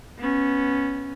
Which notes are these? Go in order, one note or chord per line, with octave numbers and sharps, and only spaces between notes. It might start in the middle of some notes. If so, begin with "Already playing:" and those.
B3 C#4